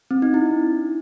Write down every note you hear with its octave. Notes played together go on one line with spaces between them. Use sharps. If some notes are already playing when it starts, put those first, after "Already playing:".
C4
D#4
E4
D4